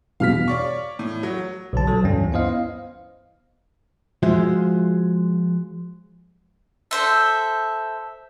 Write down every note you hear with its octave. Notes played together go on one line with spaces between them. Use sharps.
E2 G2 B2 F5 F6 B6
C#5 D5 C#6
A2
F#3
B1 D3 A5
F#3 A4
D2 G2 E3 C#4
B3 E4 C5 D#5 F5
F3 G#3 F4 F#4 C5 E5
A4 C5 E5